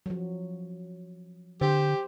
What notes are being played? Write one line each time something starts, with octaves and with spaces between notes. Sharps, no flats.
F3 F#3
D3 G4 C5